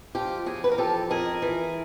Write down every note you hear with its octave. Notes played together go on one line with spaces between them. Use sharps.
F3 F4 G4
E2 F#4 G#4
B4
A#4
F3 G4 A4
F2 G#4 A#4
E3